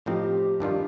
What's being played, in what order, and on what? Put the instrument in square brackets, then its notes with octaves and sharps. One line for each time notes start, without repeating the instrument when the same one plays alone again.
[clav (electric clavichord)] A2 F3 C4 D#4 [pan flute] G4
[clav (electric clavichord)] G2 D#3 G3 D4 F4